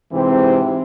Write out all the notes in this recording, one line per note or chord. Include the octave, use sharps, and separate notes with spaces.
G#2 C3 E3 C4